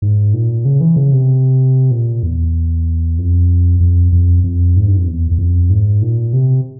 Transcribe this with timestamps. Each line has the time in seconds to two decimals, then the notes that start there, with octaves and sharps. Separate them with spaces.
0.02 G#2
0.34 A#2
0.65 C#3
0.81 E3
0.96 C#3
1.12 C3
1.91 A#2
2.23 E2
3.18 F2
3.80 F2
4.12 F2
4.44 F2
4.77 G#2
4.87 G2
4.97 F2
5.07 E2
5.31 E2
5.38 F2
5.70 G#2
6.02 A#2
6.33 C3